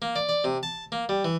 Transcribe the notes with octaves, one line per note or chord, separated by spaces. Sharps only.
A#3
D5
D5
C3
A5
A#3
G3
E3